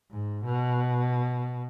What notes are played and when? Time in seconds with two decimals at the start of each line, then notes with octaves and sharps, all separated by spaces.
0.10 G#2
0.45 B2